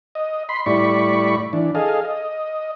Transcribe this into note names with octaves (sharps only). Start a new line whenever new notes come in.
D#5
B5 C6
A2 G3 E4 D5 B5 C#6
E3 D4
G#4 A4 D#5 F5
D#5